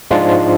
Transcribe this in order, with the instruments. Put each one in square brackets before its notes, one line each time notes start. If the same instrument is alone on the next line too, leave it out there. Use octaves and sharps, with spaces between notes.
[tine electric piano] G#2 F3 G#3 D4 F4